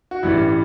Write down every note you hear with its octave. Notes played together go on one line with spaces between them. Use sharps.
F#4
A1 G2 E3 G3 E4